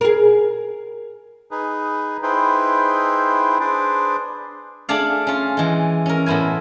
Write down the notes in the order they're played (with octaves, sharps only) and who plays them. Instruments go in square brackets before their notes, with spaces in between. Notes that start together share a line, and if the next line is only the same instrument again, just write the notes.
[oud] G#4 A#4
[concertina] D#4 G#4 B4
D#4 E4 G#4 B4 C5 G5
D4 G#4 B4 C5 D5
[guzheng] A3 D4 G#4 D5 F5
C#4 F4
E3 G#3
C#4 A#4
A2 B3 E4 C5 G#5